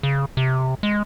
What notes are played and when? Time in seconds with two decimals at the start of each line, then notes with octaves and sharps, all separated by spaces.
0.03 C#3
0.37 C3
0.83 G#3